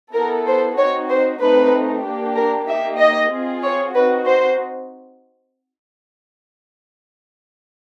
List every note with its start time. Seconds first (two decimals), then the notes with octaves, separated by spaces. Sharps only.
0.13 B3 E4 A4 A#4
0.46 C5
0.77 C4 D#4 F#4 C#5
1.09 C5
1.40 A3 C4 D#4 B4
2.04 A#3 D4 G4
2.35 A#4
2.67 A#3 D#4 G4 E5
2.98 D#5
3.30 C4 F4 G#4
3.63 C#5
3.94 C4 D#4 F#4 B4
4.25 C5